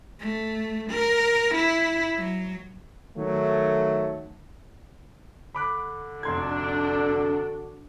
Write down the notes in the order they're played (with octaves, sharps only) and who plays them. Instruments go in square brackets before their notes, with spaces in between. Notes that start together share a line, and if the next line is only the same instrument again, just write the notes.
[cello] A3
A#4
E4
F#3
[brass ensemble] D#3 F#3 A3
[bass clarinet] D3 [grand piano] B5 D6 F#6
[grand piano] F1 C6 G#6 [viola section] D4 [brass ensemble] F#4 A4